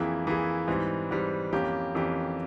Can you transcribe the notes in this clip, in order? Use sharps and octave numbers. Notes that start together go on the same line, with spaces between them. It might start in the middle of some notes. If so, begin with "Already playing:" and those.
Already playing: F2 E3 A#3 E4 G#4
F2 E3 A#3 E4 G#4
G#2 E3 G3 C4
G#2 E3 G3 C4
F2 E3 A#3 C#4 G4
F2 E3 A#3 C#4 G4